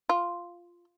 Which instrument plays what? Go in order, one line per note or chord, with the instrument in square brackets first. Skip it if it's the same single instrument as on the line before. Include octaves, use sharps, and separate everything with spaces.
[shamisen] F4